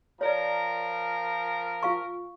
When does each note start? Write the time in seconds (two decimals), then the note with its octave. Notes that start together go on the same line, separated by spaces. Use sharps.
0.21 F3 A#4 C#5 D5 A#5
1.83 F4 F5 C#6